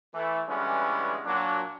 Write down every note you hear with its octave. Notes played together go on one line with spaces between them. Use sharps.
E3 A3
D3 E3 G3 G#3 B3 C#4
A#2 F#3 D4